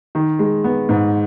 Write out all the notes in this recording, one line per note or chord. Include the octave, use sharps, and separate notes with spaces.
D#3
G#3
B3
G#2